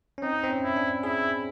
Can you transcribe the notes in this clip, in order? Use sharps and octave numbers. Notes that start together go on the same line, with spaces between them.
C#4
C4 D#4
C4
C#4
E4
D4
E4 G#4